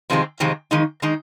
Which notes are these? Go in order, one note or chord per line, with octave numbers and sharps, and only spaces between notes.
F2 C3 D#3 G#3 C4
F2 C3 D#3 G#3 C4
F2 D#3 G#3 D#4
D#3 G#3 D#4